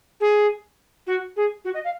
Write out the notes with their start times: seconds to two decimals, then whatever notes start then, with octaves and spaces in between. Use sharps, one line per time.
0.20 G#4
1.07 F#4
1.36 G#4
1.65 F#4
1.74 D#5
1.84 F5